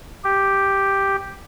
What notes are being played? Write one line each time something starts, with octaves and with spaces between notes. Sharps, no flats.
G4